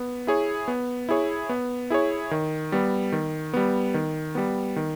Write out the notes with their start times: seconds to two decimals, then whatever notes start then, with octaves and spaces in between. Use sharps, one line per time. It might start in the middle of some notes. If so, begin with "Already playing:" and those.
Already playing: B3
0.27 E4 G#4 C#5
0.68 B3
1.09 E4 G#4 C#5
1.49 B3
1.90 E4 G#4 C#5
2.31 D#3
2.72 G3 B3
3.12 D#3
3.54 G3 B3
3.94 D#3
4.35 G3 B3
4.76 D#3